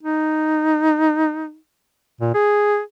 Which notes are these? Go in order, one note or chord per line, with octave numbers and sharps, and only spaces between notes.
D#4
A#2
G#4